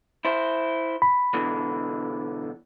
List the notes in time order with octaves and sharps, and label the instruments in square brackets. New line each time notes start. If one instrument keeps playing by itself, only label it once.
[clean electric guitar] E4 C5
[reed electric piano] B5
[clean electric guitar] B2 D3 E3